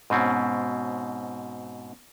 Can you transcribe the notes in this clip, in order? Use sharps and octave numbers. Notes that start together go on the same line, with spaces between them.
G#2 B2 C4 C#4